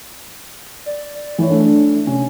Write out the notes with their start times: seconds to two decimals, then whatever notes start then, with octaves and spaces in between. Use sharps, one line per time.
0.86 D5
1.38 E3 C#5
1.50 A3 D4
2.07 C3 C#4